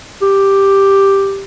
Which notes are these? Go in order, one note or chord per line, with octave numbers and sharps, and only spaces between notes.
G4